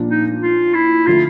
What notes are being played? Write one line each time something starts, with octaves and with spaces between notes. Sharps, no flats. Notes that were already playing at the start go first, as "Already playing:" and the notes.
Already playing: A#2 F3 A#3 D4 F4
D#4
F4
E4
D3 F3 A3 F4